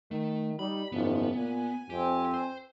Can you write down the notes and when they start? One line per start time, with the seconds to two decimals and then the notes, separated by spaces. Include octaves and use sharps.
0.11 D#3 A3
0.59 G3 D#4 B5
0.92 F#1 G#2 D#3 F3 B3
1.35 A#2 G#5
1.90 F2 C4 G4
2.34 C5